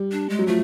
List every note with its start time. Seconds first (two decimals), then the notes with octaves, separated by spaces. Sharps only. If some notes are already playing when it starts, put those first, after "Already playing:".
Already playing: G3
0.12 D4
0.29 G#3
0.39 F#3
0.47 F3 A3